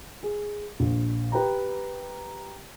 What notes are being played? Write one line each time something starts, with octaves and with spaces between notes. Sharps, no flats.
G#4
A#1
G4 B4 G5 A#5